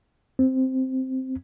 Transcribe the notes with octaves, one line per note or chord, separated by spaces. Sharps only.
C4